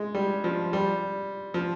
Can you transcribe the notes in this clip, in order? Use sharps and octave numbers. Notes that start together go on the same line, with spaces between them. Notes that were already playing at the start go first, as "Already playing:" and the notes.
Already playing: G#3
G3
F3
G3
F3